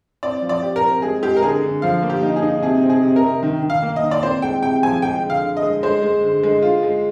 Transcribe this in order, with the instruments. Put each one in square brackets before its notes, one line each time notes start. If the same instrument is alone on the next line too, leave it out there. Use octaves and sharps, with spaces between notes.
[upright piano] C4 [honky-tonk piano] D5
[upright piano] F3
[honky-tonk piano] D5
[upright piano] G4
[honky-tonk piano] A#4
[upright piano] C4
[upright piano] G#3 [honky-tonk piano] G#4
[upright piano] G#3 [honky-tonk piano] G4
[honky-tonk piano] A#4
[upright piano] D3 [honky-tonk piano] G#4
[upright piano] D3
[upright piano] F3 [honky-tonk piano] F5
[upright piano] A#3
[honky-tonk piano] G4
[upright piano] D#4
[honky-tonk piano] G#4
[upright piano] D#4
[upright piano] C3 [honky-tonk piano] G#4
[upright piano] C4
[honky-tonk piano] G#4
[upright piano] C3
[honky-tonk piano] A#4
[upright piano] C3
D#3
D#3
[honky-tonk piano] F5
[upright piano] A#3
[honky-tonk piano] D#5
[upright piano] D#3
[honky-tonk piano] D5
[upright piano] C4 [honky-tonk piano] C5
[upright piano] G#3 [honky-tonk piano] G5
[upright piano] C3 [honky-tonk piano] G5
[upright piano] F3 [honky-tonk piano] G#5
[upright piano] G#3 [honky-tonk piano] G5
[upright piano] D3
[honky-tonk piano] F5
[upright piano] D3
[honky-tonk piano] D#5
[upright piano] G#3
[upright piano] G#3 [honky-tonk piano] C5
[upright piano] G#3
D3
G#3
F4
G#3